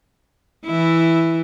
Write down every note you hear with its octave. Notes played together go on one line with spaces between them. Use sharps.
E3 E4